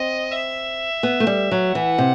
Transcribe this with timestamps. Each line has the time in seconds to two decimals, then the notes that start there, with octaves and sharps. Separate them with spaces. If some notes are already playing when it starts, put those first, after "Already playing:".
Already playing: C4 D#5
0.32 E5
1.03 B3
1.20 A3
1.27 G3
1.51 F#3
1.74 E3 F#5
1.98 C3